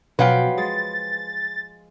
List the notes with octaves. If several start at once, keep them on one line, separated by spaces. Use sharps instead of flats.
B2 F3 F#3 B4 F5 G5
G#3 A6